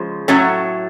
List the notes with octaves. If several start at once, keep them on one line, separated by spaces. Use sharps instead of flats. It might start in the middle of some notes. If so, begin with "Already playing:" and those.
Already playing: C#3 F3 G#3
A2 F#3 A3 C#4